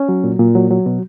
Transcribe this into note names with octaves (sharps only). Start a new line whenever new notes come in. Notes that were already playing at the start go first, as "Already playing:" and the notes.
Already playing: C#4
F#3
A#2
A#2
F#3
F#3
B2